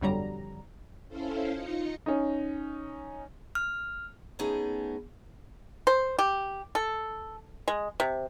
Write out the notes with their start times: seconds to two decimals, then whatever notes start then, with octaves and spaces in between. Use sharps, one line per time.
0.01 G1 F2 D3 F#3 G3 A#5
1.09 C#4 E4 A4 C5 F5
1.53 D#4 F4 D#5 C#7
2.06 C#4 D#4
3.55 F6
4.39 A3 B3 C#4 D#4 G#4
5.87 C5
6.19 G4
6.75 A4
7.68 G#3
8.00 C3